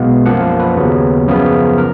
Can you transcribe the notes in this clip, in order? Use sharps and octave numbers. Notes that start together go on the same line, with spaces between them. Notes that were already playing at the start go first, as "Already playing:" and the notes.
Already playing: B1 B2 G#3 B3 F5
F#2 F3 A#3 F#5
B4
D#2 C#3 F#3 B3
F#2 C#3 F3 B3
A#4